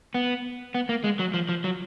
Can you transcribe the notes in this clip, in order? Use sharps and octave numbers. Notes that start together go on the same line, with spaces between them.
B3
B3
A#3
G#3
F#3
F3
F3
F#3